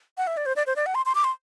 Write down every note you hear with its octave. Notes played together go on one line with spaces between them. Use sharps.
F#5
E5
D5
C5
D5
C5
D5
F#5
C6
C6
D6
C6